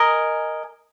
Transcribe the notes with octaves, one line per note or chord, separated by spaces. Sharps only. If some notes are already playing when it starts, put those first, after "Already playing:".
Already playing: A#4 D#5 G#5